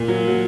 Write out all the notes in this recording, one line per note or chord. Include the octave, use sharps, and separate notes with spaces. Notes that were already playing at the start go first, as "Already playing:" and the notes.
Already playing: A#2
F#3
F#3